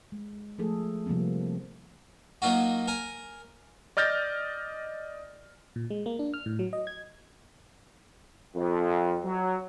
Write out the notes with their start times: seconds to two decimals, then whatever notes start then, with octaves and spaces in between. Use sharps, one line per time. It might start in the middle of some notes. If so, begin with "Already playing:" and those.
0.12 G#3
0.58 F3 A3 G#4 A4
1.06 C3 F3 G3 A#3 C4
2.42 F#3 A#3 D#4 F4 F#4
2.88 A#4 G#5
3.97 D5 D#5 F6 G6 A6 A#6
5.76 A#2
5.91 G#3
6.06 A#3
6.19 D4
6.34 F6
6.46 A2
6.59 F#3
6.73 D#5
6.87 G#6
8.55 F2
9.24 F#3